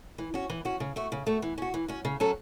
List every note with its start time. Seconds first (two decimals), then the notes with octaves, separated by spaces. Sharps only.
0.18 E3
0.34 C#4 F#4
0.50 E3
0.65 C#4 F#4
0.80 C#3
0.96 A3 F#4
1.12 C#3
1.27 A3 F#4
1.42 E3
1.58 C#4 F#4
1.74 E3
1.88 C#4 F#4
2.05 C#3
2.20 F#3 C#4 A4